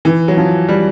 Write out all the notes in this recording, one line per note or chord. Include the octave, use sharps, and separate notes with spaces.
E3
F#3
F3
G3